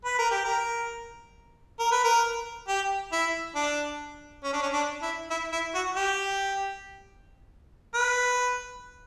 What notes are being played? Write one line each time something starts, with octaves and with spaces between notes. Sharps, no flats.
B4
A#4
G4
A#4
A#4
B4
A#4
G4
E4
D4
C#4
D4
C#4
D4
E4
E4
E4
F#4
G4
B4